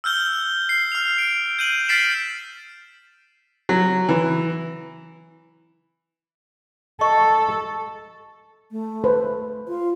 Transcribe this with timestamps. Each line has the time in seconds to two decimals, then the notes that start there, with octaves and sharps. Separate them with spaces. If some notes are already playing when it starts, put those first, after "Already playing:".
0.04 E6 F6 G6 G7
0.69 C7
0.92 F6 F7
1.18 D7
1.59 G6 D#7 F#7
1.88 F6 A6 B6 C7 D7 E7
3.69 F#3
4.09 E3
7.01 A4 D#5 C#6
8.71 A3
9.04 B4 C5
9.68 F4